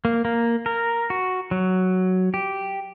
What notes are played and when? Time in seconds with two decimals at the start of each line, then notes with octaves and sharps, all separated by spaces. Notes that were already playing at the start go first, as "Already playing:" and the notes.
0.05 A#3
0.25 A#3
0.66 A#4
1.10 F#4
1.51 F#3
2.34 G4